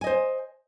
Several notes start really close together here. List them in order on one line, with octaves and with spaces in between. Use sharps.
G#5 D#5 C5